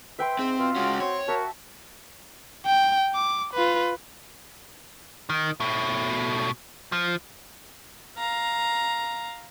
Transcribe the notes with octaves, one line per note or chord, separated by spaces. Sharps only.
B4 E5 G5 C6
G#2 C4
B2 F4
G#3 C#4 F#4
C4 C#5
F#4 A#4 E5 A5
G5
D6
F4 B4
D#3
B2 A3
F3
F5 A#5